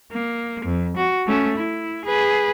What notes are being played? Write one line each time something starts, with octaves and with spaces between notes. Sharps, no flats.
A#3
F2
F#4
A3 C#4
E4
G#4 B4